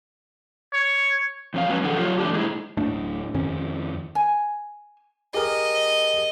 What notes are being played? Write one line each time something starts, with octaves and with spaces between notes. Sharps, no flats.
C#5
F2 C#4 F5
F#3 G#3 C#4 B4
D#3 F3 D#4 G#4 A4 F#5
F#3 F4 G4 C#5
E3 A3 D4 G4
G#3 D#4 E4 G#4
D1 A1 A3 D4
F2 D#3 C#4
G#5
G4 G#4 A#4 D#5